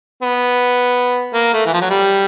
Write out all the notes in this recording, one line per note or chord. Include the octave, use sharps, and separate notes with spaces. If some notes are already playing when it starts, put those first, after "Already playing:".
B3
A#3
A3
E3
F3
F#3
G3